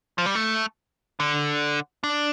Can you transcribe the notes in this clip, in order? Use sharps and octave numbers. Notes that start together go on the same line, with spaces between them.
F3
G3
A3
D3
D4